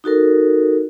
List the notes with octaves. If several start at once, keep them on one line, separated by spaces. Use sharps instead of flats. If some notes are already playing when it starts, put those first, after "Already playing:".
D#4 F#4 A4 A#4